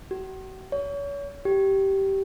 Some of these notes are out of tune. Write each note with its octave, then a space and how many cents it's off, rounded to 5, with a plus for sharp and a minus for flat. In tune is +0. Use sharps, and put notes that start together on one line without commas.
F#4 +40
C#5 +35
G4 -15